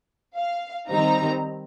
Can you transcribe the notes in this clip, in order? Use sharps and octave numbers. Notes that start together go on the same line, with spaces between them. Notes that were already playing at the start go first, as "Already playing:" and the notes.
F5
D#3 G3 C4 D#4 A#5